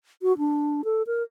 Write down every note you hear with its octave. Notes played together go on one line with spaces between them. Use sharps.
F#4
D4
A4
A#4